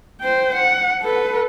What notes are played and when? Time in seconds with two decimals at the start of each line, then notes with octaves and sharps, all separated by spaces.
0.21 C5 G5
0.55 F#5
1.01 A4 B4